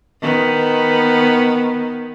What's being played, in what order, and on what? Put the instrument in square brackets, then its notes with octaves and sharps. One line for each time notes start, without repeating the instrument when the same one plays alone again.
[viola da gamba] D#3 B3